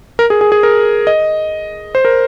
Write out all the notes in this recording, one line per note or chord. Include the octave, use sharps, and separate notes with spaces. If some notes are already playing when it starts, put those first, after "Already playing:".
A#4
G#4
G#4
G#4
A#4
D#5
C5
A#4